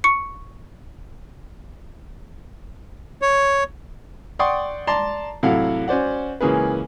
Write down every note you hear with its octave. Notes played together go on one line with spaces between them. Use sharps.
C#6 C#7
C#5
D5 F#5 G5 C6 C#6 D#6
D5 A5 A#5 C6
A2 C3 F#3 A4 F5 F#5
C#4 F#4 C5 D5 F#5
C#2 E3 A#3 C#4 G#4 B4